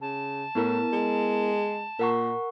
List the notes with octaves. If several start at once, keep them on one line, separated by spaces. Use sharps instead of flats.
C#3 A5
A2 B3 E4 A#4
G#3
A#2 A#4 F#5 C#6